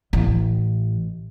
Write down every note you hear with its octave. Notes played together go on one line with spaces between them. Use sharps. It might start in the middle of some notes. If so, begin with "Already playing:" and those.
A1 E3